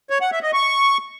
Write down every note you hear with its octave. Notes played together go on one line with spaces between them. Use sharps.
C#5
F#5
E5
D#5
C#6